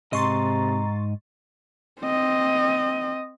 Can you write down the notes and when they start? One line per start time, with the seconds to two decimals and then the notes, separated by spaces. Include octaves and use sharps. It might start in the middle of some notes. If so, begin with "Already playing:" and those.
0.13 G#2 C3 D#5 A#5 C6 C#6 A6
2.02 C4 D#5